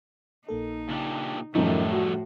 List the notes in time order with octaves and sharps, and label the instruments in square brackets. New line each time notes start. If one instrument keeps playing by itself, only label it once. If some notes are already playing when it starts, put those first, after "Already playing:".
[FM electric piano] A#1 A#3 A4 [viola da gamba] D#4
[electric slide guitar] A#2 D4 G4 [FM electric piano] C#3
[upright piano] F#2 D#3 D#4 [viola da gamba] A2 [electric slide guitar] D3 G3 A3 [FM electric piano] F3
[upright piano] F#4